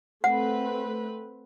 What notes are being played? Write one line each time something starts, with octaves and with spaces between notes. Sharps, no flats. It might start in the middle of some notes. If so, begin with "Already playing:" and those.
A3 C4 B4 F#5